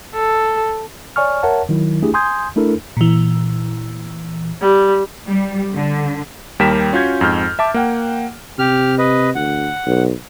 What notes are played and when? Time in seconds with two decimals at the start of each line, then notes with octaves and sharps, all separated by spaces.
0.15 A4
1.16 C#5 D5 G#5 C#6 F6
1.43 A#4 C#5 E5 F#5 A5
1.69 D#3 F#3 E4
2.02 A3 D4 E4 G4 G#4
2.14 G#5 C6 D#6 G6 G#6
2.56 A3 D4 E4 A4 A#4
2.97 A#2 E3
4.61 G3
5.27 G3
5.74 D3
6.59 D#2 G3 A#4 G5 B6 E7
6.93 C#4 F4 F#4 G6 G#6
7.21 F2 G#2 F6 G6
7.59 E5 A5 D6
7.74 A#3 F#5 G5
8.59 C3 G4 F6
8.98 B4 D#5
9.35 D2 F#5
9.87 B1